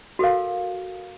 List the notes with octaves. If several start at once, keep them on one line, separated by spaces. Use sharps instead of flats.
F#4 A4 A#4 F5